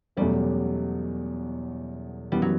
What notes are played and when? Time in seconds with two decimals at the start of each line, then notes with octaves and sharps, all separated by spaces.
0.17 E2 B2 F#3 G3 A3 C#4
2.32 F#2 E3 G3 B3
2.42 F#3